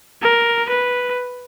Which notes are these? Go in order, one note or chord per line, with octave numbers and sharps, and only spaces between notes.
A#4
B4